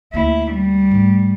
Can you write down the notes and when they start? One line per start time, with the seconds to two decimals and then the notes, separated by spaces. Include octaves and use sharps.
0.13 D2 A#3 E4
0.53 G3
0.91 G#2 A3